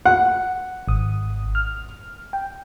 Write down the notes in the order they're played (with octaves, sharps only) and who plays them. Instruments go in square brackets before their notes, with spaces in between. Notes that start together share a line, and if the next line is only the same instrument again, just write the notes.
[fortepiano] F#5
[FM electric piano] G#1 D#6
F6
G5